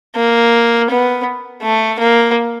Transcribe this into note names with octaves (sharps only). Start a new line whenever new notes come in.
A#3
B3
A3
A#3